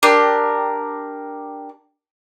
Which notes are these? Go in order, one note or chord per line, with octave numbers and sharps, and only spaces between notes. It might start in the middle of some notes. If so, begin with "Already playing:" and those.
D4 G4 A#4